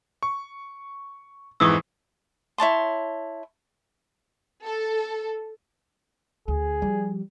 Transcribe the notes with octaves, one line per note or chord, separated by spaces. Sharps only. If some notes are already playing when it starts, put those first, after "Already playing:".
C#6
F2 G#2 E3 C#6 D#6 E6
E4 C#5 A5 C6
A4
D2 G#4
F3 G3